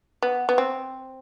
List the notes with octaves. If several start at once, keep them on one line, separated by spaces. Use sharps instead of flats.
B3
B3
C4